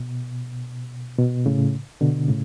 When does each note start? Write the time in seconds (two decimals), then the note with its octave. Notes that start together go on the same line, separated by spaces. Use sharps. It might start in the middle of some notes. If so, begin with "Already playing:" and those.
Already playing: B2
1.19 B2
1.46 A2 C#3
2.01 B2 D3
2.28 A2 C#3